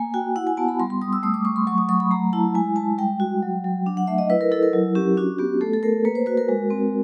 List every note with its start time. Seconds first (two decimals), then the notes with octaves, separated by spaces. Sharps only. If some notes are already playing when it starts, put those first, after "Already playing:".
Already playing: A#3 G#5
0.14 F#4 G5
0.36 E4 F#5
0.47 G#5
0.57 B3 A5
0.68 B5
0.80 G3 C6
0.90 C6
1.02 G3 D#6
1.13 E6
1.23 A3 D#6
1.34 D6
1.45 A3 C#6
1.56 C6
1.67 F#3 C#6
1.78 D#6
1.89 F#3 C#6
2.00 B5
2.11 A3 A#5
2.33 E4 A5
2.55 G#3 G#5
2.76 G#3 A5
2.98 G3 G5
3.20 F#4
3.42 F#3
3.64 F#3
3.86 D4
3.97 F#5
4.07 A3 E5
4.18 D#5
4.30 E4 B4
4.41 A#4
4.52 E4 A4
4.63 A#4
4.73 F#3
4.95 C#4 G4
5.17 D4 F#4
5.39 B3 G4
5.61 A3 A4
5.73 A4
5.83 A3 A#4
6.05 A#3 B4
6.15 C5
6.26 F#4 B4
6.37 A#4
6.49 G#3
6.70 C4